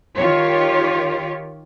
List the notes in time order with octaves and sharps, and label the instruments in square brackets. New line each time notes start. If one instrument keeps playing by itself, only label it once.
[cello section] D#3 F4 G4 C#5